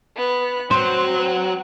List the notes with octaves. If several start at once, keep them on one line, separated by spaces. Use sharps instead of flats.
B3 F#6
F#3 C4 C5 F#6